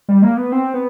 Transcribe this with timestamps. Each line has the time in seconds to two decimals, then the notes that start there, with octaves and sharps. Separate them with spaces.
0.09 G3
0.22 A#3
0.37 B3
0.52 C4
0.74 B3